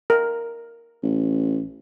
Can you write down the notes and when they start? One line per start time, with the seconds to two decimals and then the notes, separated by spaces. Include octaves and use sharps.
0.10 A#4
1.03 A1